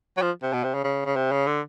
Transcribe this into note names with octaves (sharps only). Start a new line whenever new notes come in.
F#3
F3
C3
B2
C3
C#3
C#3
C#3
C3
C#3
D3